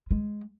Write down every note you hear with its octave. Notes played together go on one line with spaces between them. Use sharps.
G#3